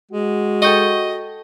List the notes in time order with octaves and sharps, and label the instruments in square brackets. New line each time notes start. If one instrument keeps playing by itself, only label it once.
[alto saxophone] G#3 [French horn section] F#4
[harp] A4 G5 C#6 [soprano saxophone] D#5